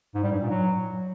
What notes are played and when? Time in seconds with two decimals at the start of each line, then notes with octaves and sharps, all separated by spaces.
0.15 G#2
0.23 G3
0.32 G2
0.41 A#2
0.50 F#3